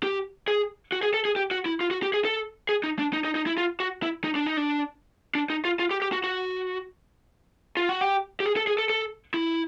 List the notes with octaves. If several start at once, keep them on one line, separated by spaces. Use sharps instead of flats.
G4
G#4
F#4
G#4
A4
G#4
G4
F#4
E4
F4
F#4
G4
G#4
A4
G#4
D#4
D4
D#4
D#4
D#4
E4
F4
F#4
E4
D#4
D4
D#4
D4
D4
D#4
F4
F4
G4
G4
F#4
F#4
F4
F#4
G4
G4
G#4
A4
G#4
A4
A4
E4